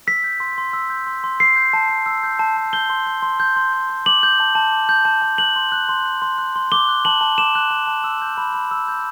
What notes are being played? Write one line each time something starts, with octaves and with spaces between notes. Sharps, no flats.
E6 B6
G6
C6
C6
E6
G6
C6
C6
E6 C7
G6
A5
A5
E6
G6
A5
A5
G6 G7
C6
G6
C6
G6
C6
G6
C6
D6 F#7
G6
A5
A5
D6
G6
A5
A5
F#6 F#7
C6
F#6
C6
F#6
C6
F#6
C6
D6 G7
F#6
A5 F#7
A5
D6 E7
F#6
A5
A5
E6
G6
B5
B5
E6
G6